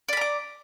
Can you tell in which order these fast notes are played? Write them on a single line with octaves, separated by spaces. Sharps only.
D5 B5 A#5 D6